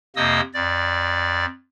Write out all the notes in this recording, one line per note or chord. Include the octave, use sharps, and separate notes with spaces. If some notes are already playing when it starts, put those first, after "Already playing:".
F2 C3 A#3 D#5 D#6 E6
F2 D5